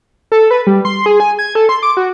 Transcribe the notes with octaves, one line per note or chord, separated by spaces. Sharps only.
A4
B4
G3
C6
G#4
G#5
G#6
A4
C6
D6
F#4